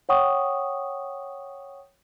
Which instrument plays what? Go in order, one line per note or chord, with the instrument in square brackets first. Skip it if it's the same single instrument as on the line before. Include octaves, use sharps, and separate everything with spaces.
[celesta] C#5 F#5 G5 C#6 D#6